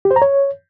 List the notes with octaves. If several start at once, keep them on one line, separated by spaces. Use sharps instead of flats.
G4
C5
A#5
C#5